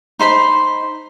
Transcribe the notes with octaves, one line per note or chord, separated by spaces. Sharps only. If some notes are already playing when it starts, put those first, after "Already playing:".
D#4 C5 B5 C6